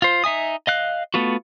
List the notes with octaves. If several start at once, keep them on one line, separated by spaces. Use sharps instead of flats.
F4 C5
D#4 E5 G#5 D#6
D#5 F5 F#6
A3 B3 F4 F#4